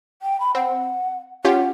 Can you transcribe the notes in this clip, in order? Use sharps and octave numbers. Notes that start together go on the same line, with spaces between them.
G5
B5
C4 F#5
C#4 F4 G4 F#5